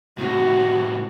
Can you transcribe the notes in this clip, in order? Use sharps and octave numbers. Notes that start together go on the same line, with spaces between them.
A2 C3 F#4